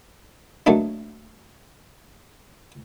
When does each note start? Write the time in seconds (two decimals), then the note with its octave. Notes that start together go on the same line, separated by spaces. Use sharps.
0.66 F#3 A3 A#3 D4 D#4